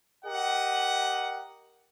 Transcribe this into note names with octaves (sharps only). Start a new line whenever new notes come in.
G4 A#4 D#5 F#5